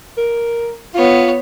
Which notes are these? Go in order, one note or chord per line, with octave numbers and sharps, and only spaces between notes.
A#4
B3 F4 C#5